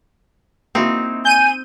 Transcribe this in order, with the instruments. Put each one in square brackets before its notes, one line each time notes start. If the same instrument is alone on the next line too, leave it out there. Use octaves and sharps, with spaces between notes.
[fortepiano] A#3 E4 F#4 [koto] C4 D#4
[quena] G#5 [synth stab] G6 D#7